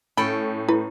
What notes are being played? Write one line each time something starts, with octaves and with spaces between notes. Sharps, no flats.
A2 C#4 A4 G5 B5
E4 B4